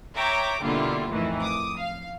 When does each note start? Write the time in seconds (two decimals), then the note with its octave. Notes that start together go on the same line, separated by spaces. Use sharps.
0.17 C#5 E5 G5 A#5 D6
0.63 B2 D3 G3 A#3 E4 F4
1.10 F2 A2 D#3 E3
1.41 D6 D#6
1.80 F5